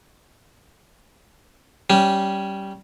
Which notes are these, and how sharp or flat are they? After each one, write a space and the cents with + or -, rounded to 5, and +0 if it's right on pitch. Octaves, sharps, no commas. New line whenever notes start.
G3 -10 C#4 +0